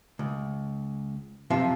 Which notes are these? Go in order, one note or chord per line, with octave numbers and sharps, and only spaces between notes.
C#2
F#2 C3 F3